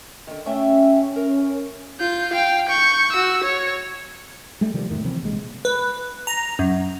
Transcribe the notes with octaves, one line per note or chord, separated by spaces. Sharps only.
D3 D#3
A3 C#4 E5 G5
A#4
F4 G6
F5 G5
C#6 G6
F#4 E6
C#5
G3 A3
C3 D#3 F3 G3
E2 G#2 D#3 A3
C3 E3 F3 C4
A#1 C3 G#3
B4
A#5
F#2